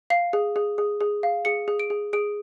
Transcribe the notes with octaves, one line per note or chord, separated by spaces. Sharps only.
F5 C7
G#4
G#4
G#4
G#4
F5
G#4 C#7
G#4
D7
G#4
G#4 D7